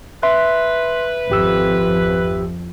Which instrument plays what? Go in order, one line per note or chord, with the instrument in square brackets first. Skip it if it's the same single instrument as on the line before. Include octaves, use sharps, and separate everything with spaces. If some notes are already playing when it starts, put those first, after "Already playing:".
[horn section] B4 [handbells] E5 [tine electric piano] C6
[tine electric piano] G#1 G4 E6 [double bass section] F2 F3